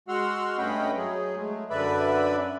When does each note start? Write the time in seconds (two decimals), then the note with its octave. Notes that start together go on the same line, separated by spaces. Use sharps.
0.08 G#3 F#4 F#5 C6 E6 F6
0.58 G2 A3 C#4 D#5 G5 B5
0.97 F#3 G#4
1.36 G#3 A3
1.70 F#2 D3 B4 D5 E5 B5